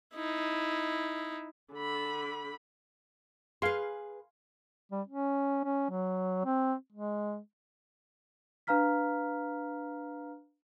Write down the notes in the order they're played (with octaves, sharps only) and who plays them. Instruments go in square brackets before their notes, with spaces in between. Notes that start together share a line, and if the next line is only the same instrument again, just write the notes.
[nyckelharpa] D#4 E4
[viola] D3 B5
[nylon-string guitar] G#4 B4 [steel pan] F5 G#5 C6
[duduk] G3
C#4
C#4
F#3
C4
G#3
[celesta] D4 B4 F5 A#5 F6 B6